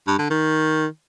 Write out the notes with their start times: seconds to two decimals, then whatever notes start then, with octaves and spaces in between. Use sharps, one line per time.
0.07 G2
0.19 D3
0.30 D#3